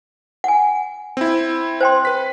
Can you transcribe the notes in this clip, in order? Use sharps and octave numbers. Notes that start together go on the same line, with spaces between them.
F#5 G#5
C4 E4
C5 G5 C6
B4 B6